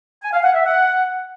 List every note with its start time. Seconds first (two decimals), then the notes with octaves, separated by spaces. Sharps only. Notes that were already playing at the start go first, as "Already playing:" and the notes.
0.23 G#5
0.33 F5
0.44 F#5
0.54 E5
0.65 F#5